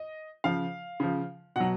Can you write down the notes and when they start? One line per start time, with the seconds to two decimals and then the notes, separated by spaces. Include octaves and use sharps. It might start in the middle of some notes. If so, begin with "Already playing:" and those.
Already playing: D#5
0.44 C#3 F3 F5
1.00 C#3 F3
1.56 B2 F#3 F#5